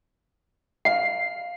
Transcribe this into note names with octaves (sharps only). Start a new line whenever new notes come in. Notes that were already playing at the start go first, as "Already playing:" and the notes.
F5 C7